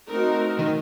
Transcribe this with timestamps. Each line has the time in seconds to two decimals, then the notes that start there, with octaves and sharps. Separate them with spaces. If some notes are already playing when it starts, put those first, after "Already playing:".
0.10 A3 C4 D#4 F#4 A#4
0.59 D#3